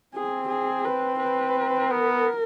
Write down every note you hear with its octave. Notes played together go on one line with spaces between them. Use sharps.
C4 G#4
G#4
B4
B4
B3 A#4